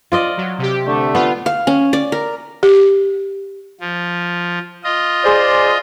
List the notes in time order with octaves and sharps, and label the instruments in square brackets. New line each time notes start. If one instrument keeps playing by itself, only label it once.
[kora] F4 D5 D#5
[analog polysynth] F#3
C3 G4
[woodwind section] D3 A3
[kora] B3 [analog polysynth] F4
[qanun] F5
C#4
D5
A#4
[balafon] G4
[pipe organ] F3
F4 D#5
[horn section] G#4 C5 D5